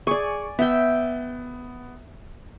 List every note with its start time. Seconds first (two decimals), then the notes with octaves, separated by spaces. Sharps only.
0.07 G#4 D5 G#5 C#6
0.59 B3 E5 G5